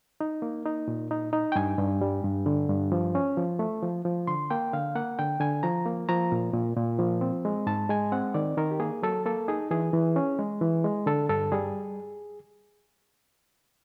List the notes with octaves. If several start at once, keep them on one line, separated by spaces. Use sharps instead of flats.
D#4
A#3
D#4
A#2
D#4
D#4
G5
G2 G#5
G2
G3
G2
D3
G2
F3
C#4
F3
A3
F3
F3
D3 C6
A#3 G5
D3 F5
A#3 F#5
D3 G5
D3 G#5
F3 A#5
A#3
F3 A#5
A#2
A#2
A#2
F3
C4
G#3
G#2 A5
G#3 G#5
C4 F#5
D#3 D5
D#3 A#4
G4
A#3 G#4
F#3 A4
A#3 A4
D#4 G#4
E3 G#4
E3
C#4
G#3
E3
G#3
D3 A4
G2 A4
G3 G#4